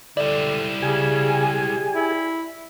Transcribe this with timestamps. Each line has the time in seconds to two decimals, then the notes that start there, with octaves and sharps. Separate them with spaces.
0.17 D3 G3 E4 D5
0.82 C#3 G4 G#4 G#5
1.95 E4